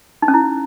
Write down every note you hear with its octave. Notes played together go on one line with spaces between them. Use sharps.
D#4
C#4
E4